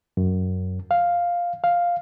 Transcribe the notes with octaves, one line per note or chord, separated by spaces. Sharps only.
F#2
F5
F5